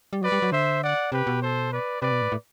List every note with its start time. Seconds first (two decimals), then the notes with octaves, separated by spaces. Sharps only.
0.13 G3
0.21 F#3 B4 D5
0.32 G3
0.42 F#3
0.52 D3 C5 E5
0.82 D5 F#5
1.11 C3 G4 B4
1.27 B2
1.41 A4 C5
1.71 B4 D5
2.02 C3 B4 D5
2.12 B2
2.22 A2
2.32 A2